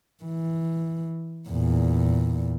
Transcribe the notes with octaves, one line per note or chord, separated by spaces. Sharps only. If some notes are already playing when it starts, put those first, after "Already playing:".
E3
E2 A#2